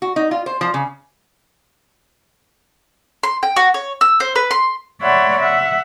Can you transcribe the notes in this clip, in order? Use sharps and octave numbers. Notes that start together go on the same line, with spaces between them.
F#4
D#4
F4
C5
F3
C#3
C6
G5
F#4
C#5
E6
C5
B4
C6
C#5 D5 E5 F#5 B5 C6
E5 F#5